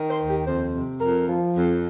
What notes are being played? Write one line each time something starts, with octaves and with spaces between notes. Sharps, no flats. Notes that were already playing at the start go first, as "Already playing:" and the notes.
Already playing: D#3
C5
D#2
G4
F2 C5
C3
F2 A#4
F3
F2